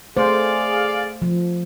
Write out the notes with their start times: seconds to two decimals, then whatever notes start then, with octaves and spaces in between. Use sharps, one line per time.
0.17 A3 G#4 C5 D5 F5
1.22 F3